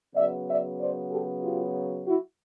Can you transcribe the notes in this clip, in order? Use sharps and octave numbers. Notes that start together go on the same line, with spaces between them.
C#3 F#3 B3 D5 E5
D5 E5
C5 D5
G4 A4
F4 G4
E4 F#4